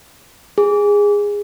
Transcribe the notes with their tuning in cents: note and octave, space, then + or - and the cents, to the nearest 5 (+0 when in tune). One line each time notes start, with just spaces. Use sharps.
G#4 -15